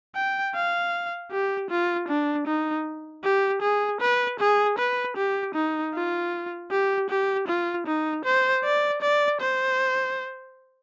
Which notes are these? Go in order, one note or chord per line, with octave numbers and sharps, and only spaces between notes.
G5
F5
G4
F4
D4
D#4
G4
G#4
B4
G#4
B4
G4
D#4
F4
G4
G4
F4
D#4
C5
D5
D5
C5